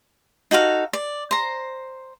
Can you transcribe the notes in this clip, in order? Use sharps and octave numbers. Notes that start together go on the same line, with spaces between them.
D#4 F#4 A4 F5
D5
C5 A#5